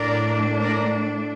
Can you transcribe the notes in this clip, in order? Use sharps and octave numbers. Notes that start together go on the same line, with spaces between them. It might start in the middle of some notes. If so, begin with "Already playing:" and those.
Already playing: A2 A3 D4 A#4 D5
A#4 D5